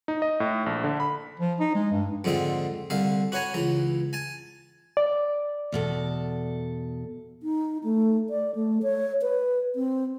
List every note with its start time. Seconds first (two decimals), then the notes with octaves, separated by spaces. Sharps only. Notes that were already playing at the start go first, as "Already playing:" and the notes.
0.08 D#4
0.22 D#5
0.40 A2
0.66 A#1
0.84 D3
1.00 B5
1.40 F3
1.60 D#4
1.75 G#3
1.92 G2
2.24 F2 G#2 D3 C4 E5
2.90 C2 D3 E5 F5
3.32 F#4 B4 C#5 G#5 A#5
3.54 C#2 E3 A#5
4.13 G#5 A5
4.97 D5
5.72 E2 B2 A4
7.43 D#4
7.84 A3
8.30 D5
8.55 A3
8.83 C#5
9.22 B4
9.75 C4